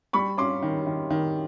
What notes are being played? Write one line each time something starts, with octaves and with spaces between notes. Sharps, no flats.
G3 B5 C#6
C#4 C6 D6
D#3
D#3
D#3